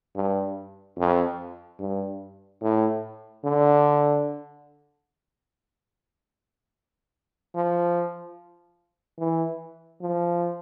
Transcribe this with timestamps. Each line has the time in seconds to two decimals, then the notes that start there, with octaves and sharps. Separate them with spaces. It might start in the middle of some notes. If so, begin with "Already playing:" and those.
0.16 G2
0.98 F2
1.79 G2
2.62 A2
3.44 D3
7.55 F3
9.19 E3
10.01 F3